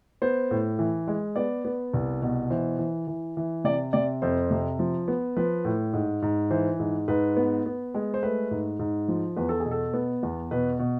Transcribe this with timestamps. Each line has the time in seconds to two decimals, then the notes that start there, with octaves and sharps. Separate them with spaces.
0.22 B3 C5
0.51 A2
0.79 E3
1.08 G#3
1.36 B3 D5
1.65 B3
1.94 C2
2.22 B2
2.50 E3 C5
2.79 E3
3.07 E3
3.37 E3
3.64 C3 D5
3.93 C3 D5
4.22 F2 C5
4.51 C3
4.79 F3
5.08 B3
5.37 F3 B4
5.65 A2
5.93 G#2
6.22 G#2
6.51 E3 C5
6.80 G#2
7.08 G#2 B4
7.37 B3
7.66 B3
7.94 G#3
8.14 C5
8.23 A3 B4
8.51 G#2
8.79 G#2
9.08 F3
9.36 E2 B4
9.49 A4
9.60 G#4
9.66 B2
9.71 A4
9.94 B3
10.23 E2
10.51 B2 B4
10.79 B2